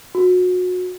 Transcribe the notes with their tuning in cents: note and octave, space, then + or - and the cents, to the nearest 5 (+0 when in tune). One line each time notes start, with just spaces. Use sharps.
F#4 -30